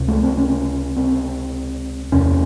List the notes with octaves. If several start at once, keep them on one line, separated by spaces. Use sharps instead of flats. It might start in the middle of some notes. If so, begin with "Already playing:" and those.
Already playing: C#2 C3
A3
C4
C#4
C4
E2 C3 C#4